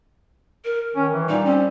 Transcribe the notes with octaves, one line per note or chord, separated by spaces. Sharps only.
A#4
D#3 C#4
E3
A#2 G3 D#4
C4 C#4